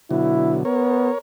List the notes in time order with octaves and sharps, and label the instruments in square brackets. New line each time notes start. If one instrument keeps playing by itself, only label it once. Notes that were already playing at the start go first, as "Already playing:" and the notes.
[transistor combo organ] B2 D3 F#3 [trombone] E4
[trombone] B3 [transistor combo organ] A#4 C#5